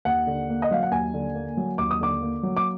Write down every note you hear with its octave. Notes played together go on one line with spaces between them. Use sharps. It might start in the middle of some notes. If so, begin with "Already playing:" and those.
D#2 F#5
D3
A#3
D#5
F#3 F5
F#5
D#2 G#5
D3
A#3
F#3
D#2 D6
D#6
D3 D6
A#3
F#3
D6